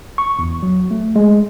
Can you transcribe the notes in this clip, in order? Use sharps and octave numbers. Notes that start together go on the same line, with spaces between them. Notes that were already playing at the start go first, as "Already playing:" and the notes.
C#6
E2
F#3
A3
G#3